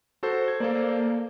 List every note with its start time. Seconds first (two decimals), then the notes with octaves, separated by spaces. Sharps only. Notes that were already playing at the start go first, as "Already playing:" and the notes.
0.23 F#4 A4 C5
0.48 G#6
0.60 A#3 A4 C5 D5